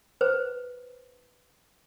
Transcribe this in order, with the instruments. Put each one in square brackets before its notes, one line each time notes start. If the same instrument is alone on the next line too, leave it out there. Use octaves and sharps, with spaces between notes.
[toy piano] B4 C5